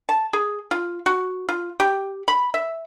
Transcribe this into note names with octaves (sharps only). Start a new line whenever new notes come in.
A5
G#4
F4
F#4
F4
G4
B5
E5